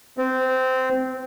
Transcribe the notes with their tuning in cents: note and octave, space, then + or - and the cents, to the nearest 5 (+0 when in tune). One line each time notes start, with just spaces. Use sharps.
C4 -15